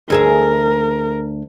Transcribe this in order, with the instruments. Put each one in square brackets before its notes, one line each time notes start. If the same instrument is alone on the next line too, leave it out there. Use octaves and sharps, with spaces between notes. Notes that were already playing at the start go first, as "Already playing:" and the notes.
[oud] D2 G#4 E5 [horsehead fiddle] A#4